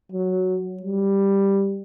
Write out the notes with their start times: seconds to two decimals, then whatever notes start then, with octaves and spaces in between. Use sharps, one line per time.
0.12 F#3
0.83 G3